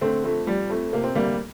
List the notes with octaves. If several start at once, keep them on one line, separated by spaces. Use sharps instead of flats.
D3 A3 C4
F2 A3
F3 G3
F2 A3
C3 A#3
C4
D2 G3 A#3